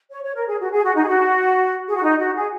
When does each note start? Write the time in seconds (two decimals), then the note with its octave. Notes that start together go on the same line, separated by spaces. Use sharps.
0.11 C#5
0.23 C#5
0.35 A#4
0.47 G#4
0.60 F#4
0.71 G#4
0.83 F#4
0.95 D#4
1.03 G#4
1.07 F#4
1.88 G#4
1.95 F#4
2.03 D#4
2.19 F#4
2.35 G#4